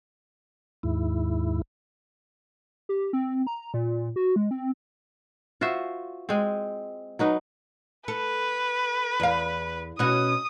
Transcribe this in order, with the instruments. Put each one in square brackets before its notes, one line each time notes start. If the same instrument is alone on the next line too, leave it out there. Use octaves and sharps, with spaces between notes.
[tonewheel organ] D#2 G#2 E4
[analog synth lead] G4
C4
A#5
A#2
F#4
G#3
C4
[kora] F4 F#4 C5 E5
G#3 C4
F#3 D#4 B4
[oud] A4 [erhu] B4
[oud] E2 F5
[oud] B2 C#4 F#4 [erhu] D#6